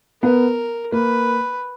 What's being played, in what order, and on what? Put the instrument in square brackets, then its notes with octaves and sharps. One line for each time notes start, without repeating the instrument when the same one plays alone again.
[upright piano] B3 [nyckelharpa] A#4
[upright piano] A#3 [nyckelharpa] B4